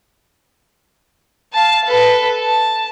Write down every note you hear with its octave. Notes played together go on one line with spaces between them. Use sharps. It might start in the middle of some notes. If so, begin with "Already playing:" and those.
F5 A5
A4 B4
A5